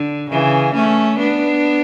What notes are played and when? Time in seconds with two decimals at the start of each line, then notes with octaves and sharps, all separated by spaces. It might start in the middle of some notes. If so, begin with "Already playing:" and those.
Already playing: D3
0.30 C#3 E3
0.74 A3 C#4
1.18 B3 D4